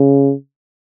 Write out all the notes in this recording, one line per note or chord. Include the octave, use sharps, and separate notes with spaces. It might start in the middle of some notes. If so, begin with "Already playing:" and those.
Already playing: C#3